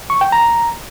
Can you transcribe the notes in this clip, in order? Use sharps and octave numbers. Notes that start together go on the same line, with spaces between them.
C#6
G5
A#5